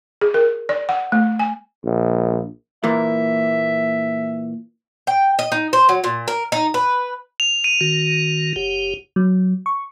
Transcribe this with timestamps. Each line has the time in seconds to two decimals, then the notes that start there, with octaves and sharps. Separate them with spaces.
0.21 G#4
0.34 A#4
0.69 D5
0.89 F#5
1.12 A3
1.39 G#5
1.84 A#1
2.84 A#2 E3 A#3 E5
5.07 G5
5.39 D#5
5.52 D#4
5.73 C5
5.89 F#3
6.04 A#2
6.28 A#4
6.52 D#4
6.74 B4
7.40 F7
7.64 D#7
7.81 D#3 F#4
8.56 F#1 G4
9.16 F#3
9.66 C#6